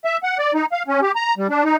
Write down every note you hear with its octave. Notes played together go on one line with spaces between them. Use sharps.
E5
F#5
D5
D#4
F5
C#4
G4
A#5
G3
D4
D#4